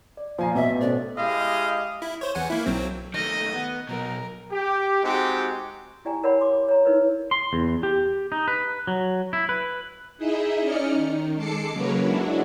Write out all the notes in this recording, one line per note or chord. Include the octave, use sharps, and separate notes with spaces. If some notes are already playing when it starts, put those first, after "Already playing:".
D5
A#2 F3 F5 G#5 A#5
A1 B2 B3 D#5 E5
C#4 A4 C5 D5
G#3 E4 G4 D#5 F5
E4
C5 C#5
E2 F#5 G#5
A#3 E4
B1 F#3 C4
D#3 A3 D#5
B3
B2 F#3 A#4
G4
G#3 C4 D#4 F#4 G4
E4 G4 D5 G5 G#5 A#5
A#4 C#5 D5 F#5 G5 B5
C6 D6
C#5 A#5
D#4 E4 A#4 B4 C#5
C6
E2
G4
D#4
B4
F#3
E4
B4
D#4 E4 G#4 D#5 E5
C#4 D#4 D5 D#5 F6 C#7
D#3
G#3 A4 A5 D6 C7 C#7
C#3 F#3 A#3 A#4 B4 C#5
F#3 G#3 D4 E4 F#4